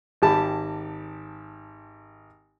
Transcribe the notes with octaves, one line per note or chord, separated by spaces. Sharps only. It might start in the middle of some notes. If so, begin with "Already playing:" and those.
G#1 G4 A5 B5